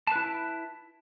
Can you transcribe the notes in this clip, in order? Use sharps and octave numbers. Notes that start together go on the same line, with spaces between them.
E4 B4 A5